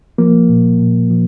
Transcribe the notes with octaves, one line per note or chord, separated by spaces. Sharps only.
F3 A#3
A#2
A#2
F3